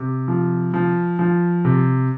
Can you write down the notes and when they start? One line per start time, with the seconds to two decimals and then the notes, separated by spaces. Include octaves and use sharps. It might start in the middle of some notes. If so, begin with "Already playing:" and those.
Already playing: C3
0.28 F3
0.74 F3
1.19 F3
1.65 C3